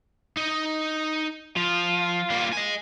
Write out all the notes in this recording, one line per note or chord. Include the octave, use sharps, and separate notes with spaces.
D#4 D#5
F3 F4
G3 A#3
D#5 G#5